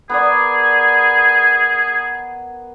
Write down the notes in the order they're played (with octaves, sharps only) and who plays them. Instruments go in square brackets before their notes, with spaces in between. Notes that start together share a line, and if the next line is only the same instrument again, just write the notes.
[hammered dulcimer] B3 A#4 D5 [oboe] G#4